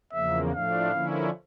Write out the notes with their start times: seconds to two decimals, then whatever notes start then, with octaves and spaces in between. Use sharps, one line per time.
0.13 E2 C#3 F3 A#3 E5
0.53 A2 F3 A3 D4 F5
0.91 D3 F3 A#3 C#4 E4